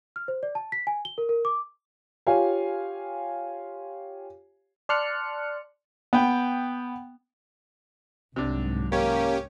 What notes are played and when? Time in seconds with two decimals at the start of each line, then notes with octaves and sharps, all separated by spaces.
0.16 F6
0.28 C5
0.43 D5
0.55 A5
0.72 B6
0.87 G#5
1.05 G7
1.18 A#4
1.29 A#4
1.45 D6
2.27 F4 G4 C#5 F5 G#5
4.89 D5 A5 C6 F6 F#6 C#7
6.13 B3 G5
8.36 C2 G#2 C3 F#3 D4
8.92 A#3 C#4 G4 C#5